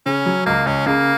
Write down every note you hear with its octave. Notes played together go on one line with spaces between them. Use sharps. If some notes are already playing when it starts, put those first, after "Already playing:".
C#3 C#4
F#3
C#2 A#3
C#2 C#4
C#3 A#3